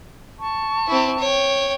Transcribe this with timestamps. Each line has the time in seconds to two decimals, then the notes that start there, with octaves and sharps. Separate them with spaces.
0.39 A5 C#6
0.87 C4 E4
1.19 C#5 G5